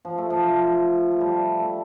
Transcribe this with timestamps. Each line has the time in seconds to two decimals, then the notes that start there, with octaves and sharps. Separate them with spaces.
0.05 F3
0.18 A3
0.30 F3
1.11 A3
1.21 G3
1.59 A3